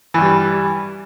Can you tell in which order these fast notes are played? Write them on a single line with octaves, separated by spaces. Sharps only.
E3 G2 G3